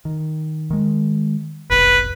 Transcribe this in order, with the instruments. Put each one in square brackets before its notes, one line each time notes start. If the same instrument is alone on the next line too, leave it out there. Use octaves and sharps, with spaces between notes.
[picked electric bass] D#3
D#3 G#3
[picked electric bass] F1 B1 [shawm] B4